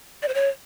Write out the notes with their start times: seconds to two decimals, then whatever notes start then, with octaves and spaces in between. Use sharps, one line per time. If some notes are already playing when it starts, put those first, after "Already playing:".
0.22 D5
0.28 C5
0.34 C#5